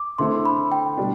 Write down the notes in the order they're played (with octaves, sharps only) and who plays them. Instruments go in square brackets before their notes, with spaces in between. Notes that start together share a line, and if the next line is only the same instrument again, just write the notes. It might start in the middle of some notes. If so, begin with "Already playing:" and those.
Already playing: [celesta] D6
[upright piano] D3 A3 C4 E4 A4 [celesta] C6
[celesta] B5
G5
[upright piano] B2 G3 D4